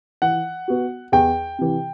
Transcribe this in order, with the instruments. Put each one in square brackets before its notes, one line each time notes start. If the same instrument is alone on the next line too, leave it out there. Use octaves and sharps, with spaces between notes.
[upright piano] E3 [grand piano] F#5
[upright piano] B3 F#4
[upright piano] E2 [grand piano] G5
[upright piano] C3 E3